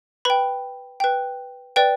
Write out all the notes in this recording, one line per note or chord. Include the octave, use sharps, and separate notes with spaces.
B4 G5 B5
B4 G5
B4 D5 G5